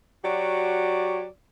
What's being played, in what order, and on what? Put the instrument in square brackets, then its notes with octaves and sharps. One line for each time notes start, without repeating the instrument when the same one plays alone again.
[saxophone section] F#3 F#4 G4 D5